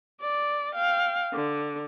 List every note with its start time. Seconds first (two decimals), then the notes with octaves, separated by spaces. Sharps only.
0.21 D5
0.75 F5 G5
1.33 D3